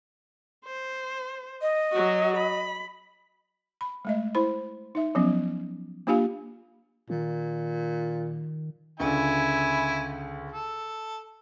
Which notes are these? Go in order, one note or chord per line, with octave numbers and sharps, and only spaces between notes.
C5
D#5
F#3 F#4
B5
B5
G#3 A3 D#5
E4 C5 B5
D#4 E5
F3 F#3 B3 C#4
A#3 D4 F4 G4 F5 G#5
A#2 D#3
C#2 D3 E4 G#5
A4